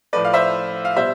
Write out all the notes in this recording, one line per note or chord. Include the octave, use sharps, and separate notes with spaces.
A2 F3 A3 B4 D5
F5
C5 E5
F5
B2 G3 C5 E5